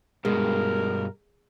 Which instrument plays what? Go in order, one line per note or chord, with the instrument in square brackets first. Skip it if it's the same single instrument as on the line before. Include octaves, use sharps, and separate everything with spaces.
[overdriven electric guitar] G2 B2 [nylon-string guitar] G#3 [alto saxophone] A#4